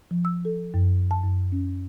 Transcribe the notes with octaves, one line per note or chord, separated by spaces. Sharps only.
F3
E6
A4
F#2
A5
F#2
C#4